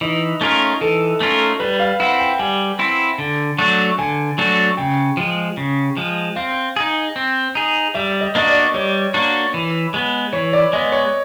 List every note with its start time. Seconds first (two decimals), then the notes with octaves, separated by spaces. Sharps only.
0.01 E3 D#4
0.41 A3 C#4 F4 A#4
0.81 E3 A4
1.20 A3 C#4 F4 A#4
1.60 G3 B4
1.80 F5
2.00 C4 E4 F#5
2.20 G5
2.39 G3 G#5
2.79 C4 E4
3.18 D3
3.58 F#3 A3 D4 F#4
3.98 D3 G#5
4.38 F#3 A3 D4 F#4
4.77 C#3 G5
5.17 F3 G#3
5.57 C#3
5.97 F3 G#3
6.36 C4 F5
6.76 D#4 G#4
7.16 C4
7.55 D#4 G#4
7.94 G3 E5
8.21 D#5
8.35 A#3 D4 F#4 D#5
8.49 D5
8.74 G3 C#5
9.14 A#3 D4 F#4
9.54 E3
9.94 G#3 B3
10.33 E3 C#5
10.53 D5
10.73 G#3 B3 D#5
10.92 C#5